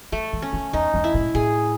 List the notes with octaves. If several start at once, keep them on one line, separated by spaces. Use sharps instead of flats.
F#3 A3
E3
C#4
D#3
E2 D#4
E2
E4
G#2
A2 G#4